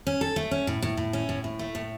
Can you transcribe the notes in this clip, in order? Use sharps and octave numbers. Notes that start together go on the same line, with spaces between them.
C#4
A4
A3
C#4
A2
A2
A2
C#4
A2
A2
A3
A2